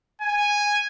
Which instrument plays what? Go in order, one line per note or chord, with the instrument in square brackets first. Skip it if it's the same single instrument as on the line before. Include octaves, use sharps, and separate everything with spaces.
[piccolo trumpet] G#5